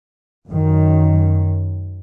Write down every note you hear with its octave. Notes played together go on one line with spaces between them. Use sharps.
F#2 D#3